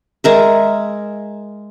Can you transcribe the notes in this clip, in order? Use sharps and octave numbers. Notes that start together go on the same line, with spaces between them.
G#3 A#4 E5